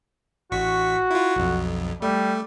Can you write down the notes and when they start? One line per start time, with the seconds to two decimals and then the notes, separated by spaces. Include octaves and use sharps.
0.51 A1 F#4 C#6 B6
1.11 E4 F4
1.36 B1 F2
2.02 G3 A3